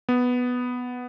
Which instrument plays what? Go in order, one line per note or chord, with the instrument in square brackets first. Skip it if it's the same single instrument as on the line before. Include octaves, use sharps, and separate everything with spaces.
[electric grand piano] B3